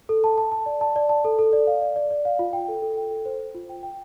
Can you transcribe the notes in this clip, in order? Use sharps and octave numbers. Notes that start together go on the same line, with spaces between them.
A4
A5
A5
A5
D5
A5
D5
A5
A4
A4
D5
F5
D5
D5
D5
F5
F4
G5
A4
A4
G5
A4
C5
C5
F4
G5
G5